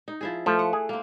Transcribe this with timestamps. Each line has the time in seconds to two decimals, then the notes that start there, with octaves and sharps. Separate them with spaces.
0.08 D#4
0.21 F3 E4 G#4
0.46 F3 A3
0.59 F#5
0.73 G#4
0.89 A#3 C4